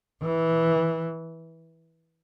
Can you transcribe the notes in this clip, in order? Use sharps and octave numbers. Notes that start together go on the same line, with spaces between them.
E3